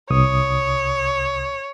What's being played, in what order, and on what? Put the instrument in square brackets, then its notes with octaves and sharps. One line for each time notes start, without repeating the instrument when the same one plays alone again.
[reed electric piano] C2 D#6 [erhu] C#5